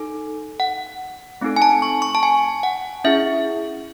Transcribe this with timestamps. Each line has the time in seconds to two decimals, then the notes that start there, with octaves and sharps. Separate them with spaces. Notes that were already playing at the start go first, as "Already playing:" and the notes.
Already playing: D#4 A4
0.60 F#5
1.41 A3 C4 D#4 A4
1.56 G#5
1.62 A5
1.82 C#6
2.02 C#6
2.15 A5
2.23 G#5
2.63 F#5
3.04 C#4 E4 G#4 E5